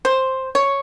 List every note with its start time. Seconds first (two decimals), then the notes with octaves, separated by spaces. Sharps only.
0.05 C5
0.55 C#5